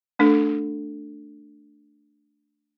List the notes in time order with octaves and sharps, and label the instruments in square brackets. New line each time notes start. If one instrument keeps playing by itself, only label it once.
[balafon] A3 D4 A4